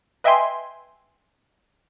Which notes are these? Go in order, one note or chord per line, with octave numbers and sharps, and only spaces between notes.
B4 D#5 E5 G5 G#5 C6